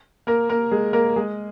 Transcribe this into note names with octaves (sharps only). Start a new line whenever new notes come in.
A#3 A#4
A#3 A#4
G#3 G#4
A#3 A#4
G#3 G#4